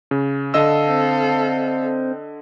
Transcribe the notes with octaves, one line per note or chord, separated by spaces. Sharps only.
C#3
D3 A4 D#5 F5 E6
C4 C5